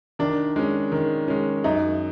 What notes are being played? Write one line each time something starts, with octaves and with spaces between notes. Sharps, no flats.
D#3 D4
G#3 C#4
D#3
G#3 C#4
F#2 D#4